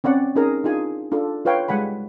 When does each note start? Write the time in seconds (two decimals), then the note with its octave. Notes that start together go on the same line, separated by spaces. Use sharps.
0.04 C4 C#4 D5 F#5
0.36 C#4 D#4 G#4 A#4 A#5
0.64 D4 D#4 F4 G#4 G#5
1.12 D4 F4 A4
1.45 F4 B4 C#5 F5 G5
1.68 G3 G#3 F#5 G#5 B5